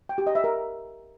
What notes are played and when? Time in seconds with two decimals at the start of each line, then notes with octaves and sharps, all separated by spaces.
0.09 G5
0.18 G4
0.27 D#5
0.35 E5
0.44 A#4